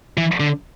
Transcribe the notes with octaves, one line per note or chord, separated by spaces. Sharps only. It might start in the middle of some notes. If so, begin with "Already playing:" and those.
E3
D3